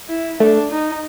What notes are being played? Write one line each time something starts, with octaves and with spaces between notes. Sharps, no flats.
E4
A3 D4
D#4